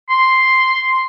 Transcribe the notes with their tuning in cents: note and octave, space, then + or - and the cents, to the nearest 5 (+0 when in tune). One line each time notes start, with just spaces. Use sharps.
C6 +0